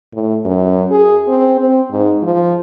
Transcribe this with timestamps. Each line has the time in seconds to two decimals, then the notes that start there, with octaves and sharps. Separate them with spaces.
0.13 A2
0.45 F#2
0.91 G#4
1.28 C4
1.60 C4
1.91 G#2
2.23 F3